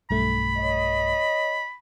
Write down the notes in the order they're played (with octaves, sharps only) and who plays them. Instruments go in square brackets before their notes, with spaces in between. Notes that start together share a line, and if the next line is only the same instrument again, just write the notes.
[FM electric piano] B1 G2 A3 [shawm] B5
[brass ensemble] C#5 D#5